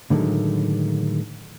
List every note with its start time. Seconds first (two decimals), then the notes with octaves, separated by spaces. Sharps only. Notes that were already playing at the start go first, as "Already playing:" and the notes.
0.10 A2 D3 D#3 F#3 G#3 A4